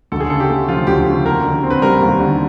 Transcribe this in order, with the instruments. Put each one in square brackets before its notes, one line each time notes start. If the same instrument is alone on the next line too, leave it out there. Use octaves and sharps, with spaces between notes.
[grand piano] D2 [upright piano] A4
[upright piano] G#4
[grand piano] C#3 [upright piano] A4
[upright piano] G4
[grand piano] A3
[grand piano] F3 [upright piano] F4
[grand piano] D2 [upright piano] G4
[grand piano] C#3
[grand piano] D#2 [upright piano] A#4
[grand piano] D3
C4
[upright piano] B4
[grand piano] G3 [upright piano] A#4
[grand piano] D#2
D3